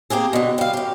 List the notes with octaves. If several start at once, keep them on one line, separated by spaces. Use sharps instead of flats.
A#3 C4 G4 G#4
B2 D3
G3 F5
F#2 G4